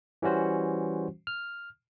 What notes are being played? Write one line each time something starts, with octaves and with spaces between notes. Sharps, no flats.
E3 G3 C#4 F#4 C5
F6